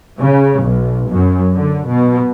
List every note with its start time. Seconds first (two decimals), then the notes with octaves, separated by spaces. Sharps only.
0.19 C#3
0.60 B1
1.11 F#2
1.54 D3
1.88 B2